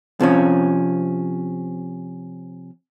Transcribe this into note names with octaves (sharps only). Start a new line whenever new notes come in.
C3 F3 C#4